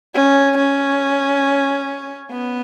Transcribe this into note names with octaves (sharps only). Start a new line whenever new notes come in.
C#4
C#4
B3